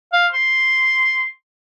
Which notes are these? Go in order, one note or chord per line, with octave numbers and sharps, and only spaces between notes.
F5
C6